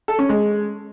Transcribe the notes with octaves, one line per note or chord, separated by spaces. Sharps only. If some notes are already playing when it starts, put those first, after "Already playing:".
A4
C#4
G#3